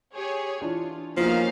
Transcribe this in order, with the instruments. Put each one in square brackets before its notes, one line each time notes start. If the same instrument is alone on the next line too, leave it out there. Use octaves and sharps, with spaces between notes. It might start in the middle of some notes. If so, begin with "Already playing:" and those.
[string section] G4 G#4 C#5
[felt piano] E3 D4 D5 [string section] F4
[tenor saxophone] F3 [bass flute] A#3 [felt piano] B3 F#4 [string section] C#4 D#4 F5